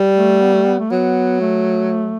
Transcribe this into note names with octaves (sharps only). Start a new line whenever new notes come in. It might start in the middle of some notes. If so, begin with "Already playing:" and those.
Already playing: G3
A3
B3
A3
B3
A3
F#3 B3
A3